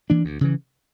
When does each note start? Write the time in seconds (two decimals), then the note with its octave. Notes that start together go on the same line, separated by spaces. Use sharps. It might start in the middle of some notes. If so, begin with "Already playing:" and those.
0.10 E3 A#3 D4
0.25 D2
0.41 C#3 E3